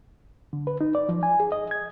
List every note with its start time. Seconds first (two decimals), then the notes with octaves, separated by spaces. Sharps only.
0.53 D3
0.67 B4
0.81 D#4
0.95 D5
1.09 F3
1.23 G#5
1.40 G#4
1.52 D#5
1.71 G#6